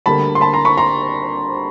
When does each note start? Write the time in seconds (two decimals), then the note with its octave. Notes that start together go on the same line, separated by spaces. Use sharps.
0.06 D2 D3 G3 A#3 A5 B5
0.35 C6
0.41 A5 B5
0.53 A#5 C6
0.65 B5 C#6
0.77 A#5 C6